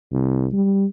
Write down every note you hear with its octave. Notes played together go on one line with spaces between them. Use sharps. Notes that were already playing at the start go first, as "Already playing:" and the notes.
C2
G3